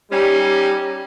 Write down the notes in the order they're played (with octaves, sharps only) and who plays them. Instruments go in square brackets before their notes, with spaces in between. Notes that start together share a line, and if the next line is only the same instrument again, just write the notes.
[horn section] G3 C#4 D#4 [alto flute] G4